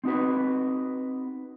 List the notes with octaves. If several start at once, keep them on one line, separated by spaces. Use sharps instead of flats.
C4 D#4 F#4 B4